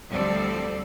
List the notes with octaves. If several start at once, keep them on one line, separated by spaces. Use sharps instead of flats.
D2 F3 G3 C4 A4 D5